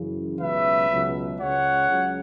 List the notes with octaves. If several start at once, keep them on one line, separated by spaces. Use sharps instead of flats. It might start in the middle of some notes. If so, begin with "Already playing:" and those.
Already playing: F#2 C#3 E3
C#2 B2 F#3 B4 E5
C#2 B2 F#3
C#2 C#3 G#3 C#5 F#5
C#2 C#3 F#3